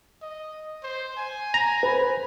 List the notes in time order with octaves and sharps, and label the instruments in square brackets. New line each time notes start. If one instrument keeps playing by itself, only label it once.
[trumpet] D#5
C5
G#5
[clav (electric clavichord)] A#5
[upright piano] B4 C5 [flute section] B5